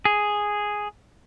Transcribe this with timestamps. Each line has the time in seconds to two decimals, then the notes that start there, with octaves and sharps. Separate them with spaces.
0.05 G#4